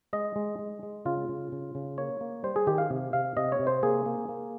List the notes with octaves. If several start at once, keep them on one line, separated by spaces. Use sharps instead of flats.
G#3 D#5
G#3
G#3
G#3
C#3 F4
C#3
C#3
C#3
A#3 C#5
A#3
G3 C5
G#4
D#3 G4
F5
C3
C3 F5
C3 D#5
C#5
C3
C5
A#3 G#4
A#3
A#3